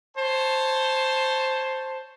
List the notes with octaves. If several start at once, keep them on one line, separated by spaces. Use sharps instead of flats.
C5 C#5 A5